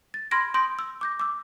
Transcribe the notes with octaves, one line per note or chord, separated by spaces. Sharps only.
A6
B5 C6 F6 G#6 A#6 D7
C6 D#6 G6 A#6 D7
E6
D6 G6 A#6
D6 E6